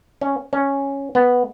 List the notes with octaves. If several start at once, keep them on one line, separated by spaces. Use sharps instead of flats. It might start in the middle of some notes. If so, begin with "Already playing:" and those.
C#4
C#4
B3